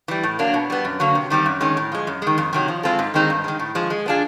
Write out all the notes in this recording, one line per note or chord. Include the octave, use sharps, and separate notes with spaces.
E3 G3
A2
F#3 A#3 D4
B2
G3 B3
F#2
D3 F#3 A#3
C3
D#3 G3 C4
F#2
D#3 G#3 C#4
A2
F3 G#3
F#2
D#3 G#3
F2
C3 D#3 F#3
F3
G#3 C4 F4 A4
G#2
D#3 G#3 C4 D#4
G2
D#3 G#3
A2
F3 G#3
G#3
B3 D4 F4 G#4